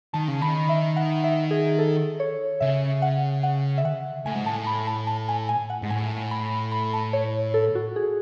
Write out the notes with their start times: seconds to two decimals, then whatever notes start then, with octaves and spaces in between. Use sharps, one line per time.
0.13 D#3 A5
0.28 C#3
0.41 D#3 B5
0.69 E5
0.96 F#5
1.24 E5
1.51 G#4
1.79 A4
2.20 C#5
2.60 C#3 E5
3.02 F#5
3.43 F#5
3.78 E5
3.85 F#5
4.26 A2 G#5
4.35 G#2
4.44 A2 A5
4.67 B5
4.87 A5
5.07 A5
5.28 G#5
5.49 G#5
5.70 F#5
5.82 G#2
5.90 A2 G#5
6.31 B5
6.72 B5
6.93 A5
7.13 C#5
7.54 A4
7.75 F#4
7.96 G#4